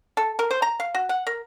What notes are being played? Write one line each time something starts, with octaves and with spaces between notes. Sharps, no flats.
A4
A#4
C5
A#5
F5
F#4
F#5
A#4